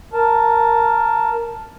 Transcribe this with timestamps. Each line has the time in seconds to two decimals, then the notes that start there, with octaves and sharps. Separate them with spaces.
0.13 A#4 A5